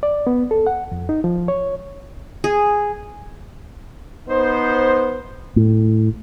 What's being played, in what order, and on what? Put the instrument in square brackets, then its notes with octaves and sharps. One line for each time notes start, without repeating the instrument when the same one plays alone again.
[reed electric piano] D5
B3
A4
F#5
F2
D#4
F3
C#5
[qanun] G#4
[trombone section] B3 D#4 C5
[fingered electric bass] A2